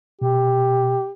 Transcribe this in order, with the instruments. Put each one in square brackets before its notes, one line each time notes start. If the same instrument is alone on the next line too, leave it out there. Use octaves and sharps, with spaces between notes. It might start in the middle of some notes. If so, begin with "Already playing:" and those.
[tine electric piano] B2 [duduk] G4